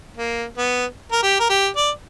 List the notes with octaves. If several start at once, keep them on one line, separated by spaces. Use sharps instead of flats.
A#3
B3
A#4
G4
A#4
G4
D5